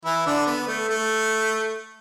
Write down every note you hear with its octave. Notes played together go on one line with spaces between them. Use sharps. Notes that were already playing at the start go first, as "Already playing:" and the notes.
E3 E4
D3 D4
B3
A3
A3